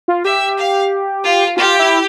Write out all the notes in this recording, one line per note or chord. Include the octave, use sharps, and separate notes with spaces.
F4
G4 E5
F5
F4
F4 G4
E4